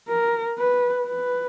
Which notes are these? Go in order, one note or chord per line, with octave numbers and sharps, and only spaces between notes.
A#4
B4
B4